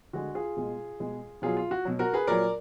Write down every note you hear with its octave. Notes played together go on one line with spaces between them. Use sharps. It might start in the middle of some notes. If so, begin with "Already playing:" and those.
D3 G#3 F#4
F4 G#4
B2 G#3
B2 G#3
B2 F#3 F4 G#4
F4
F#4
B2 F#3
F#4 A#4
G#4 B4
A#2 F#3 A#4 D5